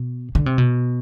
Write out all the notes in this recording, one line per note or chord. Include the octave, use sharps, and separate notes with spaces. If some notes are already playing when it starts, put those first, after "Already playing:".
Already playing: B2
D3
C3
B2